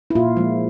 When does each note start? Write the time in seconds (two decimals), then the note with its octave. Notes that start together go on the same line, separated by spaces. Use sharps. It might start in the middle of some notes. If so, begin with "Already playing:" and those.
0.10 E4
0.15 A#2 F4
0.37 F3 G#3